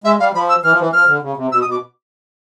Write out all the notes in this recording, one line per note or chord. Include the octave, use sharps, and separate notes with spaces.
G#3 E5
G3 F5
F3 B5
E6
E3 F6
F3
E3
F3 F6
D3
C#3
C3
B2 E6
D#6
B2
D6